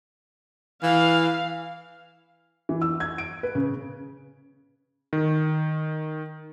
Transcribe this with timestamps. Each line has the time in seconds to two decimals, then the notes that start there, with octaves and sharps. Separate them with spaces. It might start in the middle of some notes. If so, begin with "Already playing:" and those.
0.83 E3 F5
2.69 E3
2.82 E6
3.00 G#6
3.18 D7
3.43 B4
3.55 C#3
5.13 D#3